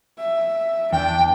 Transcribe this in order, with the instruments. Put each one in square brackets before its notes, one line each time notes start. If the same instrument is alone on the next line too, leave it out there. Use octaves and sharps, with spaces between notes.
[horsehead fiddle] E5
[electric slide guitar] E2 [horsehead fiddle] D4 [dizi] G5